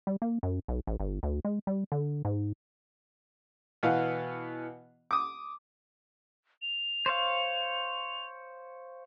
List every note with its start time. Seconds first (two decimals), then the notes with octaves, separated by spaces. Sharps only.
0.07 G3
0.22 A#3
0.43 F#2
0.68 B1
0.87 A1
1.00 G1
1.23 D2
1.45 G#3
1.67 G3
1.92 D3
2.25 G#2
3.83 B2 E3 B3 F5 F#5
5.11 D6 D#6
6.62 F7
7.06 C5 C#5 F5